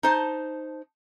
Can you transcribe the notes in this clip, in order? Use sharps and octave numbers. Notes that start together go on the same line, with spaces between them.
D#4 C5 A5